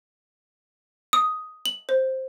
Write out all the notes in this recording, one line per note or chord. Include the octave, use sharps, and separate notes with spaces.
D#6
F#7
C5